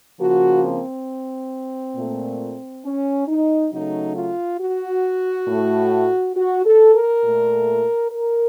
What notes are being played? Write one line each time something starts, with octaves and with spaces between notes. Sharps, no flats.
C#3 F3 A#3 F#4
C4
A#2 A3
C#4
D#4
C#3 F#3 A3 D#4
F4
F#4
A2 A3
F#4
A4
A#4
A#2 A3
A#4